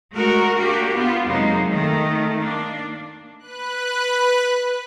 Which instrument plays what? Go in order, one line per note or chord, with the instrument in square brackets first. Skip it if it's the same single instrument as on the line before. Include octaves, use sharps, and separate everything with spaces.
[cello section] G#3 A3 F#4 A#4
A#3 D4 F#4 G4
B3 F4
F2 C3 F#3 G#3 A#3 D#4
D#3 A3
A#3 D4
[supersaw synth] B4 F#6